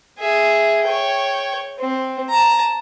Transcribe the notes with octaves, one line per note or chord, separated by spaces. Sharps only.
G#4 E5
C#5 G5
C4
A5 A#5